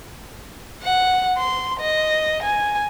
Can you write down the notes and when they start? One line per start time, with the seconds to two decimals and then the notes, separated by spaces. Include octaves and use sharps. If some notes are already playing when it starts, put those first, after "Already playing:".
0.83 F#5
1.37 C6
1.80 D#5
2.43 G#5